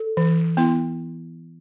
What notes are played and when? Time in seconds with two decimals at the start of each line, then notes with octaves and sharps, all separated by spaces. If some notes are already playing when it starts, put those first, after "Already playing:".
Already playing: A4
0.17 E3
0.57 B3 E4